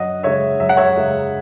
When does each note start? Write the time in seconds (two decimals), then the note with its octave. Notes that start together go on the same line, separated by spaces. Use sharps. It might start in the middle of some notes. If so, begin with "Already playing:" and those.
Already playing: F#2 D#5 F#5
0.23 C#3 G#3 C#5 E5
0.60 F#2 E5
0.69 F#5
0.77 C#5 E5
0.97 C#3 G#3